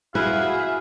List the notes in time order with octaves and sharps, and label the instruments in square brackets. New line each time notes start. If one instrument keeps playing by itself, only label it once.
[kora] E4 B4 [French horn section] F#4 [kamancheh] G#4 E5 [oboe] F5